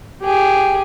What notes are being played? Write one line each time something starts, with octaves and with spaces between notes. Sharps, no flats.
G4 G#4 G5